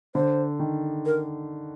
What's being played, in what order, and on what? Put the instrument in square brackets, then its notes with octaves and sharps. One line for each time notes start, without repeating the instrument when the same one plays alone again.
[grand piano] D3 [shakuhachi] C5
[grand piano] D#3
[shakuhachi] A#4